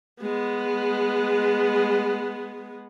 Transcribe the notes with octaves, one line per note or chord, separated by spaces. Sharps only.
G#3 B3